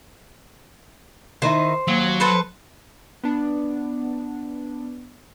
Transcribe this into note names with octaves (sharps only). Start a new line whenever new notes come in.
D#3 D#4 E4 C5
D#2 F#3
A4 B4 C5
B3 D4